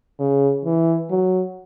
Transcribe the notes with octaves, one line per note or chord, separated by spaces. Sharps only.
C#3
E3
F#3